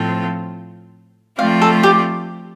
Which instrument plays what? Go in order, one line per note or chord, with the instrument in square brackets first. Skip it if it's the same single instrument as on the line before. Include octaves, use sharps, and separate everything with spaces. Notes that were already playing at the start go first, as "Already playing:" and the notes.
Already playing: [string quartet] A2 F3 C4 F4 A4
[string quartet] F3 A3 C4 F4 D5 [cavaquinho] F5
[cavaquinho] A4
G4